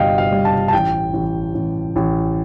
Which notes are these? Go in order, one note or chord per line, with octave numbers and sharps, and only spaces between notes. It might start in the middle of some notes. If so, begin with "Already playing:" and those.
Already playing: G1 G2 G3 D#5 F5 G5
F5
G3
A5
A5
A1 G5
A1
A1
A1